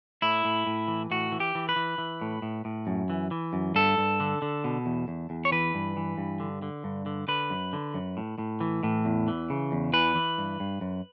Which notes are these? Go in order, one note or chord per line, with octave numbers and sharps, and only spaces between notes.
A2 E4
A2
A2
E3
A2 F#4
E3
G4
E3
B4
E3
E3
A2
A2
A2
F#2
E3
E3
F#2
G2 A4
G2
D3
D3
B2
E2
E2
E2
C#5
E3 B4
G2
E3
G2
D3
D3
G2
D3
D3 B4
F#2
D3
F#2
A2
A2
E3
A2
E2
E3
C#3
E2
E3 B4
E3
G2
G2
F#2